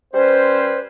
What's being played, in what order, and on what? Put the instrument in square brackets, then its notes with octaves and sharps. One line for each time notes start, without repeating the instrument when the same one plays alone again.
[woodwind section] G3 C#4 B4 C5